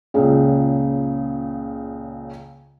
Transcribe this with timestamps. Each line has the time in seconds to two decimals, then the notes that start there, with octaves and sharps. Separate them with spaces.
0.14 C#2 A#2 C#3